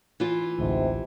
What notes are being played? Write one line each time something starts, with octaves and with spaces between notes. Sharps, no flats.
E3 F4
A1 D2 G#2 C3